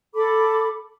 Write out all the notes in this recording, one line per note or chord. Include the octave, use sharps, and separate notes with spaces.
A4 B5 D6